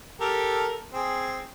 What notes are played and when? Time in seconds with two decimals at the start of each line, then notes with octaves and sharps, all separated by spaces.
0.21 G4 A4 A#4
0.93 C4 G#4